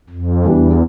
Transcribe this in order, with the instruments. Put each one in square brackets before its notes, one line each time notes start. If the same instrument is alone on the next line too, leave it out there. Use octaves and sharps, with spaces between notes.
[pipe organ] F2
[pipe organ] E2 [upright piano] E3 G3 B3 D4